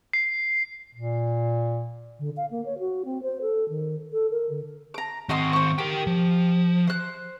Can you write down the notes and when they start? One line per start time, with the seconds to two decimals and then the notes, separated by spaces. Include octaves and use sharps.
0.13 C7
0.95 A#2
2.19 D3
2.37 F5
2.51 A#3
2.65 C#5
2.79 F#4
3.05 C4
3.23 C5
3.42 A4
3.69 D#3
4.12 A4
4.31 A#4
4.49 D3
4.94 A#5 D6
5.29 D#3 C4 F#4 D#5 C6
5.53 C5 C#6
5.78 G4 A#4 G5
6.07 F3
6.87 C5 F#6